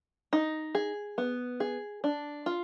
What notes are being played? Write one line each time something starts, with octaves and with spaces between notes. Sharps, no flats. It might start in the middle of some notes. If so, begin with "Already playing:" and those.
D#4
G#4
B3
G#4
D4
F4